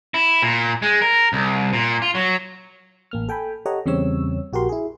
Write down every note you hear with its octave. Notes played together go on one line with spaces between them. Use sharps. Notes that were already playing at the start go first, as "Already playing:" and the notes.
E4
A#2
G#3
A#4
C2
A#2
F4
F#3
A1 A#3 F6
A4 G5 G#5 B5
G4 A4 C#5 D#5 F#5 A#5
E2 C#3 G3 C4 C#5 E6
A#1 F#4 G4 A#4 C6
E4 G#4